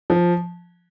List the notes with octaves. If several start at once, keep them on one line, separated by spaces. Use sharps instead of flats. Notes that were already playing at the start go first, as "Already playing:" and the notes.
F3